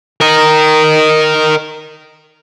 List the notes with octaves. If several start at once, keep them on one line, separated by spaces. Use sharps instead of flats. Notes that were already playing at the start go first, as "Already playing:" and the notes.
A#4 D#5